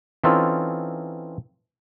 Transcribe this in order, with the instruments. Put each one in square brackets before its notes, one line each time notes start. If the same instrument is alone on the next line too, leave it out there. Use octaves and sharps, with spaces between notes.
[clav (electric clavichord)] E3 C4 C#4 D#4 F4 A4